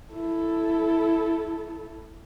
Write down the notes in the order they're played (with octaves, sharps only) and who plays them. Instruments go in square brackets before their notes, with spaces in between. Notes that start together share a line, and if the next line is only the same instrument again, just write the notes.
[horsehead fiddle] E4 A4